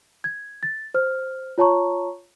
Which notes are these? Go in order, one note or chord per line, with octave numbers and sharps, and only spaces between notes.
G#6
A6
C5 F6
F4 C#5 A5 A#5 C#6